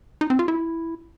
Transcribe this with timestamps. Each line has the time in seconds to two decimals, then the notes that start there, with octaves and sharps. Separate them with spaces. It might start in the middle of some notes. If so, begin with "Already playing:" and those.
0.21 D#4
0.30 C4
0.39 F4
0.48 E4